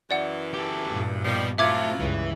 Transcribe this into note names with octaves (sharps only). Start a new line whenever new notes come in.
F#2 E3 D5 F#5
G4 A4
G2 A#2
B2 D#3 F3 G3
F#3 A3 C4 E4 F4 E5 D6 G#6
C#2 G2 E3